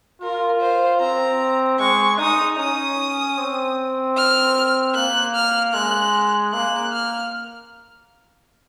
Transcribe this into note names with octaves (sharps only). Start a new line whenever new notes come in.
F4 A#4
C5
C4 A#5
G#3 C#6
D#4 D#6
C#4 D#6
C4
F6
A#3 F#6
F6
G#3 F#6
A#3 F#6
F6